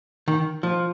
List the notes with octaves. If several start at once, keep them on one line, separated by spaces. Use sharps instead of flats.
D#3
F3